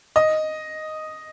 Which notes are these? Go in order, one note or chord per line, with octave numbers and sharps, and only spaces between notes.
D#5